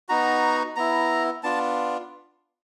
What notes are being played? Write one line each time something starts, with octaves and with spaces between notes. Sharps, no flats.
B3 D#4 F#4 A#5
B3 E4 A#5
B3 D4 F4 A5